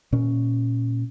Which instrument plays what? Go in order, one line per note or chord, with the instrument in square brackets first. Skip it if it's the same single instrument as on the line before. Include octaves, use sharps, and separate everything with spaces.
[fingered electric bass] A#2 C#4